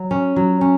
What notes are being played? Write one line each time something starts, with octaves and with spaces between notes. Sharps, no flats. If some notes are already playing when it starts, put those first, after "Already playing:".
Already playing: F#3
C#4
F#3
C#4